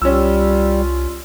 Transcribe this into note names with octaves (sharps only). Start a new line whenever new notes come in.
C2 G3 C#4 F4 E6